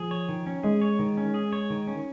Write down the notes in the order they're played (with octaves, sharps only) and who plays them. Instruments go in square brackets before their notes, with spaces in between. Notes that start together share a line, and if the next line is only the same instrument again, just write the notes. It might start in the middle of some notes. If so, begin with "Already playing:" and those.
Already playing: [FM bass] F3 [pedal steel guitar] G#4
[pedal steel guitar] C#5
D#3
C#4
[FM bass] G#3 [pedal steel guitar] G#4
[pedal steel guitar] C#5
D#3
C#4
G#4
C#5
D#3
C#4